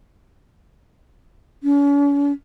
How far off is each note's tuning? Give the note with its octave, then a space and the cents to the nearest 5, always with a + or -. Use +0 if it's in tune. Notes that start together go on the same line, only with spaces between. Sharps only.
C#4 +40